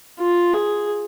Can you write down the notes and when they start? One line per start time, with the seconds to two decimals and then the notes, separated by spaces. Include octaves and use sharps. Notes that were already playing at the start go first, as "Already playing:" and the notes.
0.20 F4
0.53 G#4